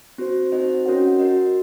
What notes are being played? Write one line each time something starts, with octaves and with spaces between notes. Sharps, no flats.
C4 F#4 C5
C4 D#4 F#4 C5 D#5
C#4 F#4 A#4 C#5 F#5
F#4 A#4 D#5